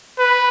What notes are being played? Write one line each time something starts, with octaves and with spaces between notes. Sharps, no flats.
B4